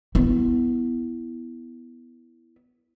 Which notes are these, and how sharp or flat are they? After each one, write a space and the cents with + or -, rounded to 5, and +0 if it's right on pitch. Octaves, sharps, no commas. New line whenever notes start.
B3 +0 E4 +0